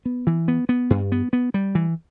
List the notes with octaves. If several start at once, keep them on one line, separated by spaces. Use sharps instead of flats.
B3
E3
B3
B3
G2
B3
B3
G3
E3